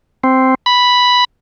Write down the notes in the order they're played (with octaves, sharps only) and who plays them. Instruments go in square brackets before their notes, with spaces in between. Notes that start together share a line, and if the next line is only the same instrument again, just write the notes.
[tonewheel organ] C4
B5